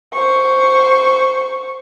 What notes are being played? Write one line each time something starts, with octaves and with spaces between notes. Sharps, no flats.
C5 C#6